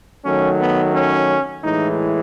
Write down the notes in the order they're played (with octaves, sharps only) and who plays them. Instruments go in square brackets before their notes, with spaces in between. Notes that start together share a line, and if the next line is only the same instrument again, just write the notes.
[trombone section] D#3 F#3 A3 C#4
B3
C#4
A2 E3 G#3 D#4